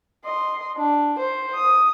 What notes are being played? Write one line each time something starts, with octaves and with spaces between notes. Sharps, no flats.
D#5 C6
D4
C5
D#6